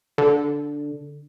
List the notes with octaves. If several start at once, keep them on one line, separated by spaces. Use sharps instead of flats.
D3